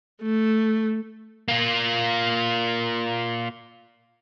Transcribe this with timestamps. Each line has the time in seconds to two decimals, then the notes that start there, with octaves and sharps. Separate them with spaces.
0.22 A3
1.48 A#3 F4